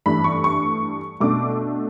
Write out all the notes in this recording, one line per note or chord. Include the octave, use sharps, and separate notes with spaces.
G2 E3 A3 D4 B5
C#6
C#6
B2 A3 D4 D6